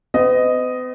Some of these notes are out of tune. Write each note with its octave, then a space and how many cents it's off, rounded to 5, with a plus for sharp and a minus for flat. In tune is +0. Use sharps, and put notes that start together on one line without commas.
B3 +45 D#5 +0